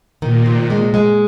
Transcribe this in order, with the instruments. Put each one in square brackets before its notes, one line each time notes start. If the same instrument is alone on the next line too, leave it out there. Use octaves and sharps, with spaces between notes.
[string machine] A#2 [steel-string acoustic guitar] D#3
[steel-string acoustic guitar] C3
G#3
G#3